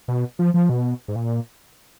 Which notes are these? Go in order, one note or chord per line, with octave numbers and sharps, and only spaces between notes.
B2
F3
F3
B2
G#2
A#2